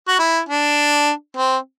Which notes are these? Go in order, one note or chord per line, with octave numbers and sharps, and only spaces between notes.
F#4
E4
D4
C4